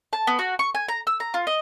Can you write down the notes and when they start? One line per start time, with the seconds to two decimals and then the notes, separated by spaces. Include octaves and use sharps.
0.13 A5
0.27 B3
0.39 F#4
0.59 C#6
0.75 G#5
0.88 A#5
1.07 E6
1.20 A#5
1.34 F4
1.47 D#5